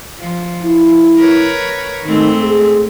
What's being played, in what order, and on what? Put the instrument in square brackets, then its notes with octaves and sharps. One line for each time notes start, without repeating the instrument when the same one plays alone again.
[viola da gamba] F3
[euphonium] E4
[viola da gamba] A#4 B4 C#5
[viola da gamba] G#2 A3 C4 [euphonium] D#3
[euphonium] G#4